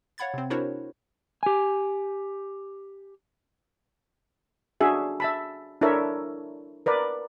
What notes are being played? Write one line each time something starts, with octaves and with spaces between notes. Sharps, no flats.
C#5 F5 F#5 B5 G#6 A6
C3 C4
D4 E4 F#4 A#4 C5 C#5
G4 G#5
D4 F#4 G#4 E5
E5 A5 B5
D4 E4 A4 A#4 C#5 E5
A#4 B4 D5